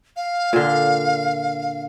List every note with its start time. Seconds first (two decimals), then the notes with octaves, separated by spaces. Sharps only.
0.16 F5
0.53 A#2 D3